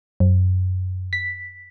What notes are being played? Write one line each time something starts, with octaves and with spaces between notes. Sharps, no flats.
F#2
B6